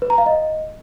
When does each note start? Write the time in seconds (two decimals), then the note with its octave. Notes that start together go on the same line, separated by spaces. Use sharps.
0.02 B4
0.10 A#5
0.18 F5
0.26 D#5